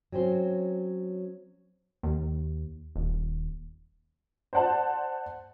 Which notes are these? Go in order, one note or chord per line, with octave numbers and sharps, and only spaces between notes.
F#3 C4 C#4 C5
D#2
D#1
C5 D5 F#5 A5